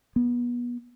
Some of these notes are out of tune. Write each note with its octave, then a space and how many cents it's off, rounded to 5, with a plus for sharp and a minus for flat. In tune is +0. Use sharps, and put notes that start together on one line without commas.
B3 -30